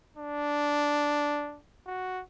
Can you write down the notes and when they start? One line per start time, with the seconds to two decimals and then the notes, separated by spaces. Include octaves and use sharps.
0.17 D4
1.86 F#4